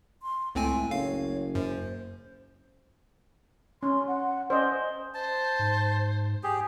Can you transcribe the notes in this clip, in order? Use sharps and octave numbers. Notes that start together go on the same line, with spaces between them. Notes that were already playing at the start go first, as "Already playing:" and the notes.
C6
C#2 A2 A3 C4 G#5
F#1 C#5 F5
F#2 C5
C#4 C6
F#5
C#4 C5 D5 D#5
C5 A5
G#2
G4 G#4